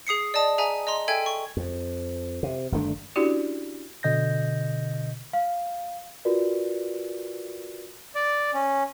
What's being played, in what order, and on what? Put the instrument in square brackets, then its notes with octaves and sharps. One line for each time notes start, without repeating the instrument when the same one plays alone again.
[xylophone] G#4 D#6 C7 C#7
D5 D#5 A5 D#6
G#4 E5 G#5 A#5
D#5 A#5 C6
A4 E5 G5 G#5 G#6
C#6
[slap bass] F2
C3
G1 D#3 A3 D4
[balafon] C#4 D4 E4 F#4 G4 D5
[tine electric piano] B2 D3 D#5 G6 A#6
[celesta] F5
F4 F#4 A#4 B4 D5
[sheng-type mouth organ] D5
C#4